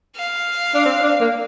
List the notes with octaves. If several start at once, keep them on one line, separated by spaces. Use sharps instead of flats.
F5
D4
C4
D4
A#3